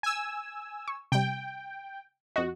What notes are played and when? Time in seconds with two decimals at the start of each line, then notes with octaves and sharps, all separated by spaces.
0.03 G#5 E6
0.88 C#6
1.12 C3 G3 G5
2.36 F2 F#4 D#5